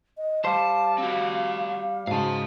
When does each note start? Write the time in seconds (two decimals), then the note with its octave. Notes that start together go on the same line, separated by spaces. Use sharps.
0.17 D#5
0.45 G3 C5 F5 A5
0.98 C4 F#4
2.07 G#2 C#3 F#4 F5 A5